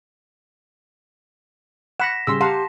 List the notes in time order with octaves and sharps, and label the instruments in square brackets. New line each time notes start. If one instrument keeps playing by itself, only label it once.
[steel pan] F#5 B5 [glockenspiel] A#6 B6 E7
[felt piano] C#3 G3 [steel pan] C6 E6
[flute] G4 [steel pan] F5 F#5 A#5 [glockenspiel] A5 [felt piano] C6